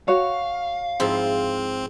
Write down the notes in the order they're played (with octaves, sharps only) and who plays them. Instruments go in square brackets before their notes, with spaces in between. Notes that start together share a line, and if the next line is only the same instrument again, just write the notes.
[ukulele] F#4 C#5 [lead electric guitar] F5
[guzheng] G#2 F3 E4 [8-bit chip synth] C4